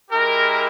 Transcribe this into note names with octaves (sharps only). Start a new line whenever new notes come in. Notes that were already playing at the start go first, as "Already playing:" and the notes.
G#3 E4 G4 A#4